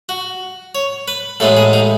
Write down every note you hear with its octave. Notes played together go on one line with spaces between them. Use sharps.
F#4
C#5
B4
A1 A2 G#3 B3 A4
G#4
D#4